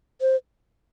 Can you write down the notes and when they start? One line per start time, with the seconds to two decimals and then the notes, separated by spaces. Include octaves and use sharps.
0.21 C5